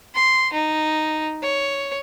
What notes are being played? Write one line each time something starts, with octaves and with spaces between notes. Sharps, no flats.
C6
D#4
C#5